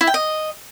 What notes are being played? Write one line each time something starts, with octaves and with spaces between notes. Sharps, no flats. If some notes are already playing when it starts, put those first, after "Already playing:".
E4
G5
D#5